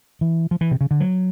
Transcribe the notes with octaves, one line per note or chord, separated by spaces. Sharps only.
E3
F3
E3
C3
C#3
D3
F#3